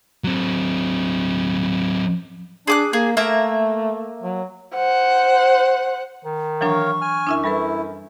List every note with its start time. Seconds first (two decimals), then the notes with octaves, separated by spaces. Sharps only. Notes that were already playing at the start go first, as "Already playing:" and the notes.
0.24 F#3 C4
2.67 D4 G#4 D6 F#6
2.93 A#3 G#4
3.17 A3 A#3 E5 A#5
4.23 F#3
4.75 C5 F#5
6.25 D#3
6.61 E3 F#3 D4 A#4 C#5 F5 C#6
7.01 G#5 F6
7.27 F#2 D4 E4 E5
7.44 G3 E4 A4 B4